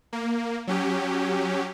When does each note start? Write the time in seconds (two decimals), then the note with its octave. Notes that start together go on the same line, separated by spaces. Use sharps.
0.13 A#3
0.67 F#3 C#4 G4